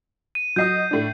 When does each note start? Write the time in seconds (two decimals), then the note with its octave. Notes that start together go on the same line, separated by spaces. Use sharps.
0.35 D#7
0.56 F#3 D#5 D#6 G6 C7
0.91 A2 D4